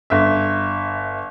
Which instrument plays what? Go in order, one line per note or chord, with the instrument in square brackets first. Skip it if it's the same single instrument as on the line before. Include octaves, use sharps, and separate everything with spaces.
[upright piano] G1 E5